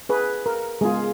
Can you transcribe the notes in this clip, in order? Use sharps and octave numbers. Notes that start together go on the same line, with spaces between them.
G#4 B4
A#4
G#3 B3 F4 G#4